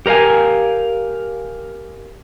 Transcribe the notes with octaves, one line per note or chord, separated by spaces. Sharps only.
G4 A#4 C5 F5 G#5